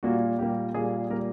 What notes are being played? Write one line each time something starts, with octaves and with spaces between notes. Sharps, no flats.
A#2 G3 A#3 F#4
A#2 G3 A#3 G4
A#2 G3 A#3 G#4
A#2 G3 A#3 A#4